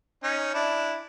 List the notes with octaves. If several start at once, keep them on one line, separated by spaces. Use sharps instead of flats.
C#4 D#4
D4 E4